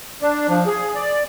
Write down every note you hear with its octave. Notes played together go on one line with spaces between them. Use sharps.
D4
F3
G#4
D5